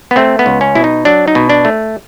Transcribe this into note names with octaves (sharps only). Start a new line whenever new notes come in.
B3
A3 C4
B3
C#2
C#4
B2 E4
D#4
F#3 D4
D#4
B2
D4
A3